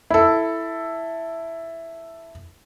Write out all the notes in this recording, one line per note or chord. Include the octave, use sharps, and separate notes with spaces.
E4 A4